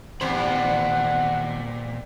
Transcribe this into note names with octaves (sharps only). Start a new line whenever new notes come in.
E2 G2 A#2 D#3 C5 F#5 B5